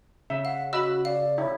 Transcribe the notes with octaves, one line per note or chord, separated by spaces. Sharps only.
C#3 E5
F5 F#5
F#4 D#5 B5 E6 F#6
D5 F5
E4 C#5